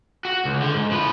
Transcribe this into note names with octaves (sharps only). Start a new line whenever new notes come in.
F#4
C#2
D3
G#2
F3 B4